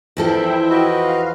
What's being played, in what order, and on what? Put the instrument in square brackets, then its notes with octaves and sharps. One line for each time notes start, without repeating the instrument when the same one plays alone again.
[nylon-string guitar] E2 F3 A4 [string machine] E4 E5 G5
[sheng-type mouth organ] F#4 B4 D#5
[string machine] F5